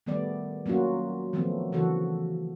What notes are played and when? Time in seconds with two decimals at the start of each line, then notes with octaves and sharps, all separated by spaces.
0.06 D#3 G3 A3 B3 D5
0.66 F#3 A#3 C#4 F4 F#4
1.33 D#3 F3 F#3 A3 B3 C4
1.72 C#3 E3 F3 F#4 A4